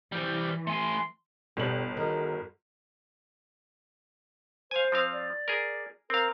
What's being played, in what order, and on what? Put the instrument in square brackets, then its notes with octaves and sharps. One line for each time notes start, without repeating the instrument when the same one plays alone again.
[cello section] E3 [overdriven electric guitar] G3 C5
[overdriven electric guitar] A3 G#5 [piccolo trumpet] C6
[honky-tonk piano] G1 F#7 [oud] B2 G3
[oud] D#3 [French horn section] F#4 G#4 A#4
[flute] C5 [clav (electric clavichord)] F5 G#5
[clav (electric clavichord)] F3 C4 F5
[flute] D5
[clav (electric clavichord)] G#4 A#4
[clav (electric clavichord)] C4 F5 [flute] A#4